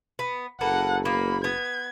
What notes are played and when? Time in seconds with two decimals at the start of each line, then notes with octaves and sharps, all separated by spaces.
0.19 B3
0.61 F#1 A#3 A4 B4 F#5
1.05 A#3 B3 B5
1.44 B3 G#6